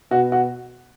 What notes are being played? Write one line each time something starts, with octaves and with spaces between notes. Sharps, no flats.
B2 F#4
F#4